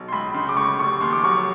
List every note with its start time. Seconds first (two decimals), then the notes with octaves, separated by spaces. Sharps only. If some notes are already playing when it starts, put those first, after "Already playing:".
Already playing: B1
0.08 C6
0.12 C#2 B5
0.34 C#3 C6
0.49 D6
0.56 C#2 C#6
0.79 F1 C#6
1.01 D#2 C6
1.13 D6
1.24 F#3 C#6